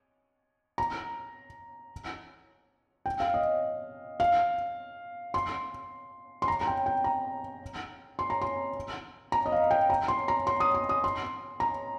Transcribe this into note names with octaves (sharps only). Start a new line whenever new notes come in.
A#5
G5
F5
D#5
F5
C6
C6
A#5
A#5
G5
G5
A#5
C6
A#5
C6
A#5
D#5
F5
G5
A#5
C6
A#5
C6
D#6
C6
D#6
C6
A#5